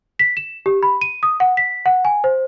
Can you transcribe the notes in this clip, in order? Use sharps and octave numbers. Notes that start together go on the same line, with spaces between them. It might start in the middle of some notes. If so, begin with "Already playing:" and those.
B6
E7
G4
B5
D#7
D#6
F#5
B6
F#5
G#5
C5